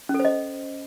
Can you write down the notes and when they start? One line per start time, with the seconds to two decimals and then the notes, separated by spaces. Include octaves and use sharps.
0.09 C#4
0.14 A4
0.20 C5
0.25 D#5